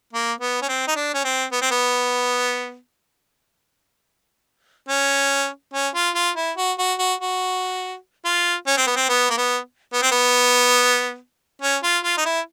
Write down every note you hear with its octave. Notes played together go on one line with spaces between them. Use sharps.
A#3
B3
C#4
C4
D#4
D4
C#4
C4
B3
C4
B3
C#4
C#4
F4
F4
E4
F#4
F#4
F#4
F#4
F4
C#4
C4
B3
C4
B3
A#3
B3
B3
C4
B3
C#4
F4
F4
D#4
E4